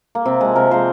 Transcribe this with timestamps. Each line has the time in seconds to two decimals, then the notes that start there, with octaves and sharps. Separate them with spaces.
0.15 A#3
0.25 C3 C4
0.41 F3 G#3
0.56 C3 A#4
0.71 F3 G#3 C5